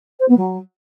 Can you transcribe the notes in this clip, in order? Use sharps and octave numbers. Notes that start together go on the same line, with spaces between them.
C5
B3
F#3